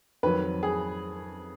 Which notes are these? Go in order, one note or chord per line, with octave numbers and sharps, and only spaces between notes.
F2 D#3 F#3 B4
G#4